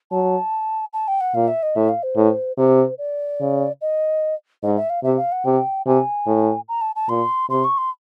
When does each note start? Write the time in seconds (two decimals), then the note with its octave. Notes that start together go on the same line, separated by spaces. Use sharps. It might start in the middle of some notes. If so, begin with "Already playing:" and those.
0.11 F#3 A5
0.93 A5
1.08 G5
1.21 F#5
1.35 A#2 F5
1.48 E5
1.63 D#5
1.76 A2 E5
1.89 F5
2.03 C5
2.16 A2
2.57 C3 C5
2.98 D5
3.40 C#3
3.81 D#5
4.63 G#2 D#5
4.77 E5
4.90 F5
5.03 C3 E5
5.17 F5
5.32 F#5
5.45 C3 G5
5.86 C3 G#5
6.26 A2
6.68 A#5
6.81 A5
6.96 A5
7.09 A#2 C6
7.50 C3 C6
7.64 C#6
7.77 C6